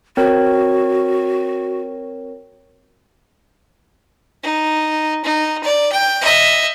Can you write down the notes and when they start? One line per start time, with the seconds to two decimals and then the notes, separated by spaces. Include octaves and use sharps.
0.17 C4 F#4 A#4 C#5
4.43 D#4
5.24 D#4
5.63 D5
5.92 G5
6.21 D#5 E5